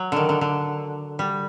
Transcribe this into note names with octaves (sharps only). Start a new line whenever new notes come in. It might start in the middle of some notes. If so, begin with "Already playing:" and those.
Already playing: F#3
D3 D#3
D3
D3
G3